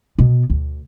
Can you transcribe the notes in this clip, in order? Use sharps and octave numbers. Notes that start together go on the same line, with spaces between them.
B2 B3
D2